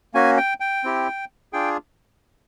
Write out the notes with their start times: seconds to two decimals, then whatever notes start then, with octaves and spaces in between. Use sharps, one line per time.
0.14 A#3 C#4 F#4 G#5
0.38 G5
0.60 G5
0.84 C4 E4 G4
1.53 D4 F4 G#4 G5